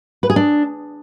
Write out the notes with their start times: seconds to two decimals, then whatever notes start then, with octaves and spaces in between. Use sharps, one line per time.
0.23 B4
0.30 G#4
0.36 D4